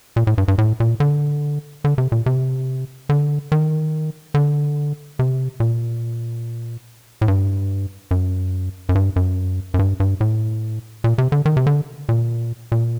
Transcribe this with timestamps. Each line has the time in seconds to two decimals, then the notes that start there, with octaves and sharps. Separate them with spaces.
0.16 A#2
0.27 A2
0.38 G2
0.48 G2
0.58 A2
0.80 A#2
1.00 D3
1.84 D3
1.98 C3
2.12 A#2
2.26 C3
3.09 D3
3.52 D#3
4.34 D3
5.19 C3
5.60 A#2
7.21 A2
7.28 G2
8.11 F#2
8.89 F#2
8.95 G2
9.16 F#2
9.74 F#2
9.79 G2
10.00 G2
10.21 A2
11.04 A#2
11.18 C3
11.32 D3
11.45 D#3
11.57 C3
11.67 D3
12.09 A#2
12.72 A#2